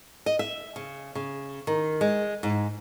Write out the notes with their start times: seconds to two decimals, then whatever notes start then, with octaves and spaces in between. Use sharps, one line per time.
0.26 D#5
0.39 E5
0.76 C#3
1.15 C#3
1.67 D#3
2.01 G#3
2.43 G#2